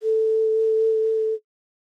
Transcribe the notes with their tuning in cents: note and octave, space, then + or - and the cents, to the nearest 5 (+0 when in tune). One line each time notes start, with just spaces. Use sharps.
A4 +5